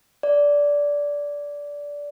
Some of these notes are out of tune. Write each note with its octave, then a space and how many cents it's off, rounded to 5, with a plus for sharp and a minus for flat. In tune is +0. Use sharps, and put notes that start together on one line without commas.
D5 -15